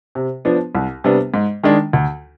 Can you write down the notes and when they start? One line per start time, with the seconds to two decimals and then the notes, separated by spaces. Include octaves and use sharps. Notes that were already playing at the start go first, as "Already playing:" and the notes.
0.15 C3
0.45 F3 B3 D4
0.75 C2
1.04 C3 G3 B3 D4
1.34 G#2
1.63 D#3 G#3 D4
1.93 D2